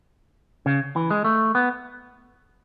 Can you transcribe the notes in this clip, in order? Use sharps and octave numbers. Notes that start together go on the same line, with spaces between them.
C#3
E3
G#3
A3
B3